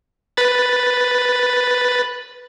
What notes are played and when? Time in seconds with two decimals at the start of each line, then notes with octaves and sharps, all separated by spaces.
0.37 B4 B5 A6